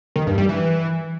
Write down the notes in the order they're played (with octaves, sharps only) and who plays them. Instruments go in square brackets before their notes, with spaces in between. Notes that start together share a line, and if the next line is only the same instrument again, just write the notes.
[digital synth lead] D#3
G2
G3
E3